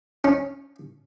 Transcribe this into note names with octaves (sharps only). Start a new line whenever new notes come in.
C#4